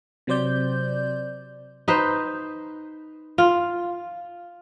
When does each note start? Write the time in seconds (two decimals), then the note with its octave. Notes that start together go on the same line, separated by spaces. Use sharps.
0.27 C3 F#3 C4 C5 D5 G6
1.88 D#4 B4 C5
3.38 F4